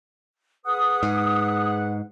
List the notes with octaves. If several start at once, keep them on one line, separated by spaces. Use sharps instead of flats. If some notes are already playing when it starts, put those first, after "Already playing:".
G#4 B4 F#5 D#6
G#2